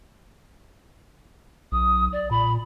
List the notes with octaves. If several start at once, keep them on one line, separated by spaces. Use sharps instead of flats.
B1 D#6
D5
A#2 B5